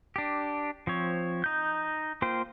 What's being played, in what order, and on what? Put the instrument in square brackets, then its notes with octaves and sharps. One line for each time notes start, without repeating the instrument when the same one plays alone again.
[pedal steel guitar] D4 G4
F3 C4 C#5
D#4 G6
A#3 F4 C5 G5